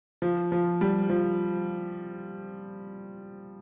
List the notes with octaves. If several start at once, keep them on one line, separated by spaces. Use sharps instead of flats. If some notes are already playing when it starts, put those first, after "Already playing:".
F3
F3
G3
F3